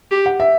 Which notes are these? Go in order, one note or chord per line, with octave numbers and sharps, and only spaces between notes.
G4
F#5
E5